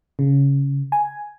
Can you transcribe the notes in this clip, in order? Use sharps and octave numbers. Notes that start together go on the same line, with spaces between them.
C#3
G#5